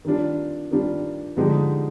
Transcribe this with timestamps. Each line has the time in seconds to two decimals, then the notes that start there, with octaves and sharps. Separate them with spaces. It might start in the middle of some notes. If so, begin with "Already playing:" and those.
0.05 D#3 G3 D4 F4
0.71 D#3 G3 D4 F4
1.37 D3 F3 G#3 D#4 G4